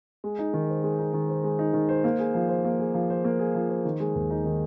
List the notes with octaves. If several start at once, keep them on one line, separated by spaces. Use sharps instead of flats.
G#3
D#4
D#3
C5
G#3
D#4
D#3
C5
G#3
D#4
D#3
C5
A#3
G#4
F3
C5
A#3
G#4
F3
C5
A#3
G#4
F3
C5
D#3
G#3
D#2
D#4
D#3